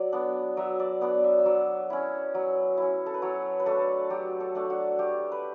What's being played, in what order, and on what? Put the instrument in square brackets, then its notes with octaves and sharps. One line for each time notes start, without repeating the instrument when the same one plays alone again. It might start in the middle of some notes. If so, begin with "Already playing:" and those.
Already playing: [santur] F#3 D5
B3 D4
F#3 E5
D5
B3 D4 D5
E5
E5
F#3 D5
C#4 E4
F#3
C#4 E4
A4
B4
F#3 C#5
B4
A3 D4 A4
F#3 G4
A4
A3 D4
F#4
A3 G4
B4